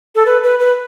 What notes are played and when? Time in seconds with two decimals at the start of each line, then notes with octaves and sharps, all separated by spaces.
0.15 A4
0.26 B4
0.43 B4
0.60 B4